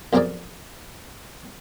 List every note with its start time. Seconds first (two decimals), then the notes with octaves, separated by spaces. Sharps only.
0.13 B1 F2 D4 G#4 A#4 D5